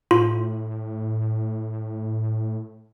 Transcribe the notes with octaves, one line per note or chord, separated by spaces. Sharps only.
A2 F4